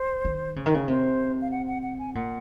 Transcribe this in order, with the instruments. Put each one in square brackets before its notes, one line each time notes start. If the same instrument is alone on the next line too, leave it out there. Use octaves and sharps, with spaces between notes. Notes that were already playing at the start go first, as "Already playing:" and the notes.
Already playing: [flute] C5
[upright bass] D#3
C#3
D#3
C#3
[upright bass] C3 [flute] C5
[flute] F5
F#5
F#5
F#5
G#5
[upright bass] A#2 [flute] F#5